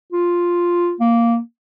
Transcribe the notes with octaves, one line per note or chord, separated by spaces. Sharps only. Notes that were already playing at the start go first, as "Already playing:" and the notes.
F4
A#3